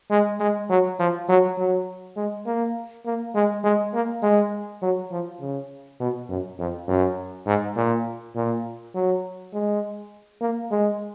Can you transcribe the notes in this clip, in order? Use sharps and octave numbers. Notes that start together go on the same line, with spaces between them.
G#3
G#3
F#3
F3
F#3
F#3
G#3
A#3
A#3
G#3
G#3
A#3
G#3
F#3
F3
C#3
B2
F#2
F2
F#2
G#2
A#2
A#2
F#3
G#3
A#3
G#3